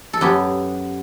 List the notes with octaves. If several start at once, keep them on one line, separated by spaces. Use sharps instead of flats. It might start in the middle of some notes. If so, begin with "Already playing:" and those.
A4
F#2 F#3 B3 G4